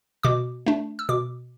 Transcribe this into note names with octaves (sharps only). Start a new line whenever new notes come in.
B2 D6
A3 D4
E6
B2 D6